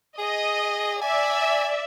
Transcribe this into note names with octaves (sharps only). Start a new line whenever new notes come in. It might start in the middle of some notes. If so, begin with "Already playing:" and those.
G#4 D#5
D5 E5 G#5